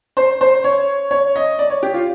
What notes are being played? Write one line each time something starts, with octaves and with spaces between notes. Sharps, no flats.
C5
C5
C#5
C#5
D#5
D5
C#5
G4
F4